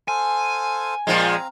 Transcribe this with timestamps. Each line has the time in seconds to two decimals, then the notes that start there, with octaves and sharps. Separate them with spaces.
0.08 A4 C5 F5 G#5
1.07 A#2 F3 G#3 C4 F5 A#5